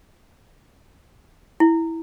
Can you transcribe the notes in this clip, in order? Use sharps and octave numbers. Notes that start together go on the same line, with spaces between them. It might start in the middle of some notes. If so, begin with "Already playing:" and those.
E4